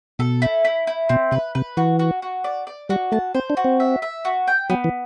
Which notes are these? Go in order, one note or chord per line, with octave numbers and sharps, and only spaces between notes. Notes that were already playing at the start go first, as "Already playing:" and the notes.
B2 A4
E4
E4
E4
B2 C4
C3 B4
C3 B4
E3 F#4
F#4
F#4
D5
D5
G3 F#4
A3 A5
C4 C5
D4
F#4
C4
E5
E5
F#4
G5
F#3 B3
E3